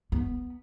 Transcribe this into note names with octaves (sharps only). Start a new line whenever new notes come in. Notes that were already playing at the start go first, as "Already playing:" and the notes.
B3